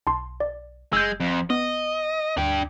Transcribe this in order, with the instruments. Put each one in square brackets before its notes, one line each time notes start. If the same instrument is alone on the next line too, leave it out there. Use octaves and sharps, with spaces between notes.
[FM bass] B1 [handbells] A5 C6
[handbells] D5
[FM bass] F#1 [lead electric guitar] G#3 [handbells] E6 G6
[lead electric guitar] F2
[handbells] B3 [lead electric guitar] D#5
[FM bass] D2 [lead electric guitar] D4 G5